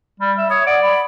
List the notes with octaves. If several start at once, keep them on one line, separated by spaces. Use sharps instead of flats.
G3
E5
C#5 D#6
D5 F#5
B5